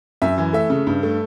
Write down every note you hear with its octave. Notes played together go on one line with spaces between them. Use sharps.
F#2 E5
E3
A3 E5
C#3
G2
A3